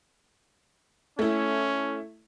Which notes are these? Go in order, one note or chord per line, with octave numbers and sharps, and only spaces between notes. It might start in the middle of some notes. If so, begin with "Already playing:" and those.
A3 C#4 E4